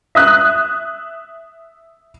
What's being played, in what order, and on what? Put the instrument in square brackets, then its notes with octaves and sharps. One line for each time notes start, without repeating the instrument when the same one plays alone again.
[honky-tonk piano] E5 D#6 F#6